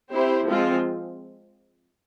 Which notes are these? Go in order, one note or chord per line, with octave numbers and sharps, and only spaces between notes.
C4 E4 G4 C5
F3 G#3 C4 F4